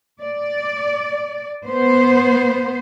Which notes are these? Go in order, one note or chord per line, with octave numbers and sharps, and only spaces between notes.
D5
B3 C5